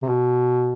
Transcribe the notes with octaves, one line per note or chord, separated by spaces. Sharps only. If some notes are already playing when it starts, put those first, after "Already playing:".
C3
B2